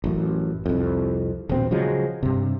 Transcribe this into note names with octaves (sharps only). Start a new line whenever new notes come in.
A1 F#2
C2 F2
D#1 A#1 B2 C4
C#3 F3 F#3 G#3
G2 C3